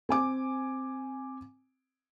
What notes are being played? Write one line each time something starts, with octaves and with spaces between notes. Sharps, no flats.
C4 G#5 D6